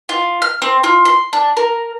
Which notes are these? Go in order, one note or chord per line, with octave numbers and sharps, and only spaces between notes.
F4
F6
C4
F4
C6
D4
A#4